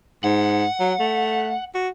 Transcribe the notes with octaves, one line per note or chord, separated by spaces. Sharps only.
G#2 F#5
F#3
A3
F#4